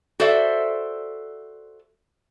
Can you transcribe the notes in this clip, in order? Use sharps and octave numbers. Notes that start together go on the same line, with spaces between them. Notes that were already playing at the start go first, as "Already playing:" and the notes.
F#4 A4 C5 D5 E5